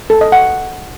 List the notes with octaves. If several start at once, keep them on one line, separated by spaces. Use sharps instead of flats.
A4
D#5
F#5